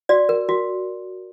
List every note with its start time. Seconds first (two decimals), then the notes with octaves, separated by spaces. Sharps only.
0.09 F#4 D5
0.29 A#4
0.49 F#4